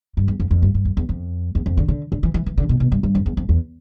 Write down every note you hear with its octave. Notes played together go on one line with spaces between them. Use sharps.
G2
E2
F2
F2
G2
G2
F2
E2
F2
E2
F2
D3
D3
D3
E3
E3
E3
D3
B2
B2
G2
G2
F2
E2
F2
E2